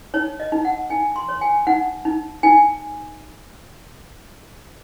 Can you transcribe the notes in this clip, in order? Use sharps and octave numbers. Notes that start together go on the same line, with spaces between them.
D#4 C#5
D#5
D#4
F#5
D#4 G#5
C6
C#5
G#5
D#4 F#5
D#4
D#4 G#5